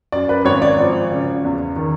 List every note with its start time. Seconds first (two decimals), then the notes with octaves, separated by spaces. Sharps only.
0.12 F#2 D5
0.29 B4
0.45 G#1 C#5
0.62 D5
0.78 F3 C#5
1.12 C#3
1.44 E2
1.76 D#3